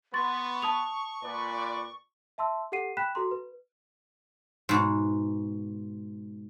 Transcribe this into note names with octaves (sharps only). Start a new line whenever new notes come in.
B3 C6 C#6 A6
A5 D#6 F7
A#2 B4 D5
E5 A5 C6 E6
G4 A4 F#5 C7 D#7
G5 B5 F#6 B6 E7
F#4 A4 A#5 C6
B4
G#2 B2